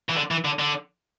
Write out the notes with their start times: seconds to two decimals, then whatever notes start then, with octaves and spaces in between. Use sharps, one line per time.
0.10 E3
0.16 D3
0.31 E3
0.45 D3
0.59 D3